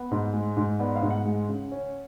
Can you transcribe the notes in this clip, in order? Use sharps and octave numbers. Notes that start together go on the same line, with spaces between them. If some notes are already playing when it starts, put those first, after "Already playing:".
Already playing: B3
G#2
G#3
G#2
B3 D5
F5
G#2
F#5
G#3
C#3
C#4